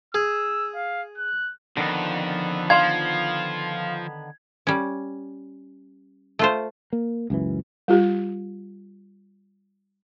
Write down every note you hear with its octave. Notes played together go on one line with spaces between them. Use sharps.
G#4 E6
F5
F#6
F2 D3 D#3 B3
F3 F5 C6 G#6
G3 C#4
A3 F4 C5
A#3
C#2 F#2 E3
G3 F4 G4